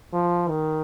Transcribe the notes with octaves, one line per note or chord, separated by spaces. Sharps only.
F3
D#3